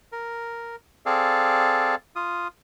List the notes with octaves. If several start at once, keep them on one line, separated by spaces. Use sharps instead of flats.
A#4
C4 G#4 A4 D5 F5
F4 D#6